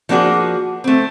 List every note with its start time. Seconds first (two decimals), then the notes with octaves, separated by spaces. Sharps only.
0.09 F3 A#3 D4 F#4 G#4
0.84 A3 C4